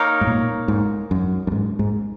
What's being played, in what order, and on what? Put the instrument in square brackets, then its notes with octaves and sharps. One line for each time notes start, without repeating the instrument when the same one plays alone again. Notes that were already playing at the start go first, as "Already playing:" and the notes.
Already playing: [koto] A#3 D#4 A#4 C#5 F5
[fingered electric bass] G#2
A#2
G#2
F#2
F#2
G#2
G#2